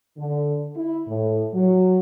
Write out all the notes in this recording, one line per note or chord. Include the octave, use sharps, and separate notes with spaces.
D3
E4
A2
F#3